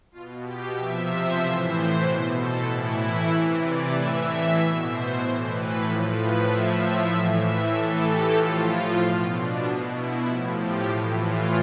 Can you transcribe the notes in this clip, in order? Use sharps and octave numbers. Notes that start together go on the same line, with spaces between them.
B2 F4
G4
C3 F3 E5
C5
A2 E3 E5
C5
B2 B4
A4
A2 E3 E4
C3 E3
D5
A2 E3 E5
B2
C5
A2 E3
B4
A2 F3 A4
B4
A2 F3 E5
E5
A2 E3 F5
E5
A2 E3 A4
G4
A2 F3 F4
B2
D4
B2
E4
A2 F3
G4
A2 E3
F4